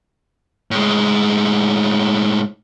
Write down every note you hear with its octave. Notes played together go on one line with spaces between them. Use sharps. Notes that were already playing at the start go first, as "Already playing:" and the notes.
A2 G#3